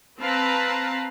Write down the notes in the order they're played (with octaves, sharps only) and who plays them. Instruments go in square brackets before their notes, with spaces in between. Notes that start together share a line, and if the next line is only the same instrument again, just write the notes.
[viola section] C4 B4 F5 A5 A#5